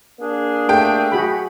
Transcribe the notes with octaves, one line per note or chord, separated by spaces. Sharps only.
A#3 D4 G#4
A3 G4 G5
F#4 G#4 B5